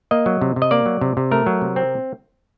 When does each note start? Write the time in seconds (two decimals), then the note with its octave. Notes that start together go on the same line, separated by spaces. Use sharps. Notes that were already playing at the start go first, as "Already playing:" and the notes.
0.11 A#3 D#5
0.26 F#3
0.42 C3
0.56 C3
0.62 D#5
0.71 A#3 D5
0.86 F#3
1.01 C3
1.17 C3
1.31 A3 A#4
1.46 F#3
1.62 C3
1.76 C4